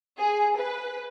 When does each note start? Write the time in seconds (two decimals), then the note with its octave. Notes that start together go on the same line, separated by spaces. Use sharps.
0.19 G#4
0.56 B4